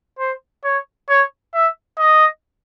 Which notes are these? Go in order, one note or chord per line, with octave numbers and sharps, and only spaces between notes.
C5
C#5
C#5
E5
D#5